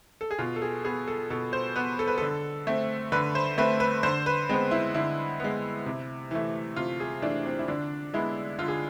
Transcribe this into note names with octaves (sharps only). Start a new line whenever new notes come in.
A4
G#4
B2 F4
A4
G#4
B3 G#4
A4
B2 A4
C5
B3 B4
A4
B4
D3 A4
A3 C4
D3 B4
C5
A3 C4 B4
B4
D3 C5
B4
G#3 B3 C4
E4
D3 E4
G#3 B3
C3
E3 A3
C3 F4
G#4
E3 A3 D4
C4
E4
D3 D4
G#3 B3 E4
D3 F4
G#4